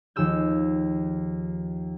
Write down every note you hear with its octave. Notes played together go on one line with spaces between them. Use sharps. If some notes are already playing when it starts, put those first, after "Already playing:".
D#2 F3 G#4 E6 G6